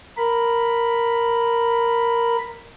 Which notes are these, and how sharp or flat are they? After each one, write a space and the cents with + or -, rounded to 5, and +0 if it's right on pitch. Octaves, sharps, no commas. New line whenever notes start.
A#4 +0 B5 +0